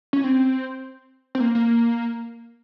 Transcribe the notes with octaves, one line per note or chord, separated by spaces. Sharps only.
C#4
C4
C4
A#3
A#3